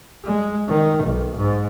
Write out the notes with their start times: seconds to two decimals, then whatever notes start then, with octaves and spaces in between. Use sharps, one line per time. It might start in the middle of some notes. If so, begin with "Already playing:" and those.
0.24 G#3
0.68 D#3
1.03 B1
1.37 G#2